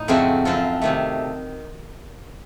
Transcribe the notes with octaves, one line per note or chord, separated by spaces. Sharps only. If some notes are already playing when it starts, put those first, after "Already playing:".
Already playing: A2 D#4
F2 C#3 A3 C4 F#4
F#2 F3 C4 F4 A4
C3 D#3 A3